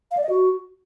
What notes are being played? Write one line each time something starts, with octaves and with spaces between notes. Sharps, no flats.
F5
D5
D#5
F#4